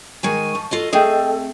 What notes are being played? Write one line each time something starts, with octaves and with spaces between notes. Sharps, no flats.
D#3 G#3 G#5 C#6
F3
F4 F#4 A4 D#5
A3 C4 G#4 A4 D#5 G5